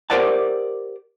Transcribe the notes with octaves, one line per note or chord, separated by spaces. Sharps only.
G4 A#4 C5 D5 F#5 A5